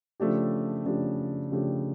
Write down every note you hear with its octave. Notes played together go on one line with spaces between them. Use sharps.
C#3 F3 A3 D4 G4
C#3 F3 A3 D4 G4
C#3 F3 A3 D4 G4